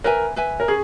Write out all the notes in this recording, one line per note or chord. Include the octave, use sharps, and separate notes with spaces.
A#4 B4 E5 G#5
B4 E5 G#5
A#4
C#4 G#4